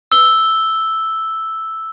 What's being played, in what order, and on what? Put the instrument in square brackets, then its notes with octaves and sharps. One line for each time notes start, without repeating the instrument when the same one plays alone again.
[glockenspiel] E6 G7